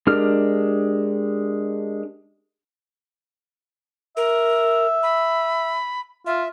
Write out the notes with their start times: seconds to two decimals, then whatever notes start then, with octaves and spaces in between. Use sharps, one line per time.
0.07 G#3 D4 G4 A#4 F6
4.17 A#4 E5
5.03 B5
6.27 F4 E5